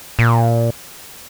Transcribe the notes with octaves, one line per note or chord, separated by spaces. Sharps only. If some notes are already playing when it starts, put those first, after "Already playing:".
A#2